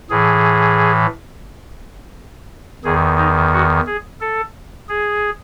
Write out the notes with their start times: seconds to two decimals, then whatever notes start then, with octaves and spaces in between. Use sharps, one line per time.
0.10 A2 E3 G#4
2.84 E2 D#3 G#4
3.18 D#4
3.53 F#4
3.87 G#4
4.21 A4
4.89 G#4